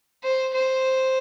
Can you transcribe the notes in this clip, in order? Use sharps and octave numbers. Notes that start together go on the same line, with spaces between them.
C5
C5